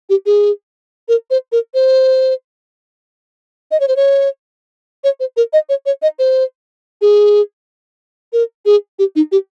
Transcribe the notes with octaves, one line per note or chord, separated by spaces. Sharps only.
G4
G#4
A#4
C5
A#4
C5
D#5
C#5
C5
C#5
C#5
C5
A#4
D#5
C#5
C#5
D#5
C5
G#4
A#4
G#4
G4
D#4
G4